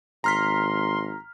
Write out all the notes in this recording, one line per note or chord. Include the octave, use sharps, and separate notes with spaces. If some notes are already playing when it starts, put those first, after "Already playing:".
G#1 A#5 C6 F6 B6